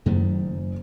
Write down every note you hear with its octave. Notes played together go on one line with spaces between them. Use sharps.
F#1 F#2 D#3 A3